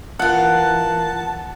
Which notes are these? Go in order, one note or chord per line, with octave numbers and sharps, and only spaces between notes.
E3 F4 A#4 F#5 A5